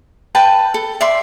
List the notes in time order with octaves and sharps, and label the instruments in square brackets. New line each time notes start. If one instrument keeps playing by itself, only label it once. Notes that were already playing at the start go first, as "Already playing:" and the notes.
[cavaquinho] B4 G5 A5
A4
D5 E5 C6